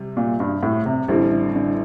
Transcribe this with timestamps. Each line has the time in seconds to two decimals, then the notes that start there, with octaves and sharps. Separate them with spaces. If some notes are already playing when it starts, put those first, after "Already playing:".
Already playing: C3 G3
0.17 A#2
0.40 G2
0.63 A2
0.86 C3
1.08 A1 A2 D3 G3 C4
1.32 D3
1.55 D3